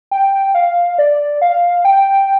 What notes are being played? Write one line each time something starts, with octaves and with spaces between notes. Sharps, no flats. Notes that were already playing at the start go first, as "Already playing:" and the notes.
G5
F5
D5
F5
G5